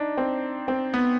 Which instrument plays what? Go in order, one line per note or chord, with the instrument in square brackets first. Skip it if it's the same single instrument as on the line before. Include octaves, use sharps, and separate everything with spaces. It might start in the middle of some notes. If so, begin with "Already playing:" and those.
Already playing: [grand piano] D4 D#4
C4
C4
B3